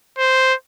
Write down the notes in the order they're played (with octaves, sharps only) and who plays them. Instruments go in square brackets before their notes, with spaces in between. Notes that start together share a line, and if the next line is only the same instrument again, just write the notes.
[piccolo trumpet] C5